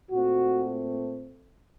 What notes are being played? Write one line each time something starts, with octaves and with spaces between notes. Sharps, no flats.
A#2 A3 C4 F#4